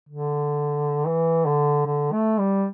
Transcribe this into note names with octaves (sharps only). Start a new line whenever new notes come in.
D3
E3
D3
D3
A3
G3